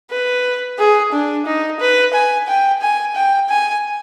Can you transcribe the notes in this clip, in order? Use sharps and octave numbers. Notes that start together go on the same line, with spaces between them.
B4
G#4
D4
D#4
B4
G#5
G5
G#5
G5
G#5